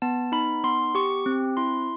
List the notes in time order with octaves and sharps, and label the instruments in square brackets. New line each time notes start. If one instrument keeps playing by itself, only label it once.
[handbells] B3 A5
D#4 B5
B3 C6
G4 C#6
C4
E4 C6